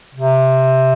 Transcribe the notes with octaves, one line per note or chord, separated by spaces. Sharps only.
C3